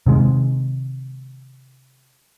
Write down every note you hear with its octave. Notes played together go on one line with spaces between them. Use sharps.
C3 D#3 G#3